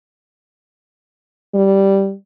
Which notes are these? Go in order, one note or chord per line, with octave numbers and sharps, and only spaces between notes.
G3